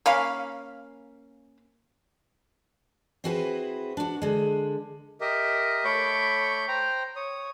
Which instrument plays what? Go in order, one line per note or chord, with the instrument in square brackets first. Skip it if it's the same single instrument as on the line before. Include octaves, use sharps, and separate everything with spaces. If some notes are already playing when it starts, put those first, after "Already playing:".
[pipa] A#3 C#4 F5 B5
[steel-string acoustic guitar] C4 E4 F#4 G#4 B4 C5
D4 F#4
D3 G#3
[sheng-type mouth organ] G4 A#4 D#5 E5
A3 C#5 B5 C#6 D6 G6
C5 G5 A#5
C#5 D#6